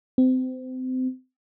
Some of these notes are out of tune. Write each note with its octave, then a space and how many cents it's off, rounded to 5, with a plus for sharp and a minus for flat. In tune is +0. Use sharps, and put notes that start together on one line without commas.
C4 -30